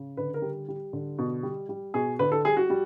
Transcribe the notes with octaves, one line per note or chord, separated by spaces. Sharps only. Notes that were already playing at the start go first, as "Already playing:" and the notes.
Already playing: C#3
D3 B4
A#4
G3
G3
D3
B2
G3
G3
B2 G#4
D3 B4
A4
G3 G#4
F#4
G3